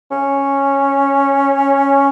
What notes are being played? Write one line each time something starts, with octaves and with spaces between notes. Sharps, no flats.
C#4